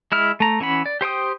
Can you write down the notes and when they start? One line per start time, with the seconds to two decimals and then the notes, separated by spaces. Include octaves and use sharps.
0.12 G#3 E4 F6
0.40 A3 A#5
0.60 E3 C#4 F#5 B5
0.86 D5
1.01 G4 C5 G5 D#6